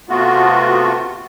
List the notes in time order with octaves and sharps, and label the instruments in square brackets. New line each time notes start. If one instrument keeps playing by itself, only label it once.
[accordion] C3 A3 B3 F4 F#4